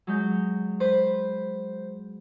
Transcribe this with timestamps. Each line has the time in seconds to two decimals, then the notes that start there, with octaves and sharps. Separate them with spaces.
0.07 F#3 G#3 G6
0.80 B4 C5